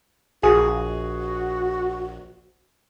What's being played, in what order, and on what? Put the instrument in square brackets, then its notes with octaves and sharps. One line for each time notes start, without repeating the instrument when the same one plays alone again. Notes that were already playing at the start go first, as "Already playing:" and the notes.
[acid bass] A#1 [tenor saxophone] F#4 [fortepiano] G#4